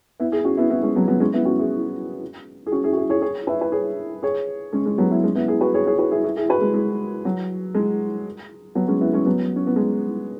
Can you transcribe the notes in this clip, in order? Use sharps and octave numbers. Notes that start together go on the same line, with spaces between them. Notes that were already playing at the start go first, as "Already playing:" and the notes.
B3 E4
E4 G#4
C#4 F#4
B3 E4
B3 E4
G#3 C#4
F#3 B3
F#3 B3
G#3 C#4
B3 E4
C#4 F#4
E4 G#4
G#4
C#4 F#4
E4 G#4
F#4
E4 G#4
G#4 C#5
G#4 C#5
B4 E5
B4
G#4 C#5
G#4 C#5
G#3 C#4
G#3 C#4
F#3 B3
B3 E4
G#3 C#4
B3 E4
E4 G#4
F#4 B4
G#4 C#5
G#4 C#5
F#4 B4
E4 G#4
E4 G#4
E4 G#4
F#4 B4
G#3
G#3
F#3
G#3
F#3 B3
G#3 C#4
B3 E4
G#3 C#4
F#3 B3
C#4
B3
G#3